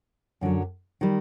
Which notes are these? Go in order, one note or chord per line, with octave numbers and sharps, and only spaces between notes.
F#2 D3 F#3
D#3 G3